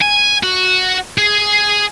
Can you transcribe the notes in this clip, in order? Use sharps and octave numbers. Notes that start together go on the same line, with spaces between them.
G#5
F#4
G#4